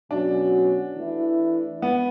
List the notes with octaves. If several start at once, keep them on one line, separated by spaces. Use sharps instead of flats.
B2 F#3 C#4 D4 F#4
E3 A3 E4
B3